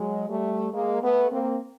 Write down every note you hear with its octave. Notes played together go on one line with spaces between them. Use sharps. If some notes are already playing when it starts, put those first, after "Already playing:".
Already playing: F#3 G#3
G3 A3
G#3 A#3
A3 B3
A#3 C4